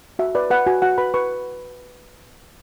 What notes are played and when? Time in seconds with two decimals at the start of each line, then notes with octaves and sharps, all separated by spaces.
0.19 F#4 E5
0.35 B4 D5
0.50 B4 F#5
0.66 F#4 G#5
0.82 F#4 F#5
0.98 B4 B5
1.14 B4 C#6